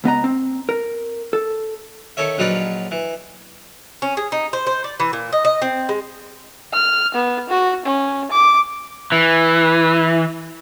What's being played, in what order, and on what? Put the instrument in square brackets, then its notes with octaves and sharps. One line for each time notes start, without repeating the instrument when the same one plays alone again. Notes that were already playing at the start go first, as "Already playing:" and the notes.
[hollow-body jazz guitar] C#2 B3 D#5 A#5
C4
A#4
A4
[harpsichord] D#3 A4 C#5 E5
A#1 F#3 D#4 F4 B4 D5
E3
[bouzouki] C#4
G#4
D#4
C5
C5
D5
E3
A#2
D#5
D#5
C4
G#3
[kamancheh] F6
B3
F#4
C#4
D6
[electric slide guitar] E3